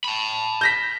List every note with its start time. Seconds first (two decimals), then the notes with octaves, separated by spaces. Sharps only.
0.04 A5 B5
0.61 G6 A#6 B6